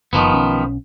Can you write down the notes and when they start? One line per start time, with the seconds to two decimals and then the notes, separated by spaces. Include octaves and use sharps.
0.13 F#1 D#3 F3 B3
0.34 B1 C#4